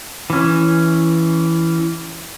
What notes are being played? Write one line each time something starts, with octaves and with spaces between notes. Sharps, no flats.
E3 C#4